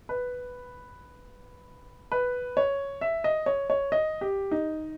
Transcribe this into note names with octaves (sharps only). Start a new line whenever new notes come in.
B4
B4
C#5
E5
D#5
C#5
C#5
D#5
G4
D#4